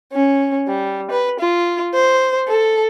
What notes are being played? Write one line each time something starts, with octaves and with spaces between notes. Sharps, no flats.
C#4
G3
B4
F4
C5
A4